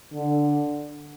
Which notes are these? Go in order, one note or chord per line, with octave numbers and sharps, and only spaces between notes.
D3